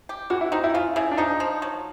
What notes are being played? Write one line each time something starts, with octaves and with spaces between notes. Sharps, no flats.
G4
E3 F#4
E4
C4 D#4
E4
C#3 F4
C#3 E4
D4
F3 D#4
F3
F#3